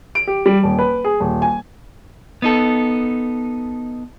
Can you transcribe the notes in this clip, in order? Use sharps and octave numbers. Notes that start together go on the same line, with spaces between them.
D7
G4
G3
D#1
B4
G#4
D#1
G#5
B3 D#4 A4